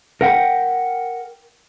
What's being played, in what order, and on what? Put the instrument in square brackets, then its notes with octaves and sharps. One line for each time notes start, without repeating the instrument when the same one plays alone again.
[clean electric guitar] A#4 F#5 G5